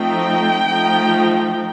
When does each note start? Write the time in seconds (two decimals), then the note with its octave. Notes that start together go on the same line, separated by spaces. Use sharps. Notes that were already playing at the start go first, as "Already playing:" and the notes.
Already playing: F3 A3 C4 D#4 G5
0.72 F3 A3 D#4